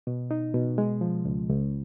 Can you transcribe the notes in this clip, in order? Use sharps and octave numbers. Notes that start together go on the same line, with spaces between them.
B2
D#4
B2
G#3
F3
C#2
C#2